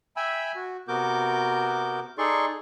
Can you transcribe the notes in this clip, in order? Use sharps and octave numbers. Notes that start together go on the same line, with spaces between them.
E5 G5 G#5 B5 E6
F#4
C3 B3 F#4 A#4 D6 G6
D#4 G#4 A4 D5 C6 C#6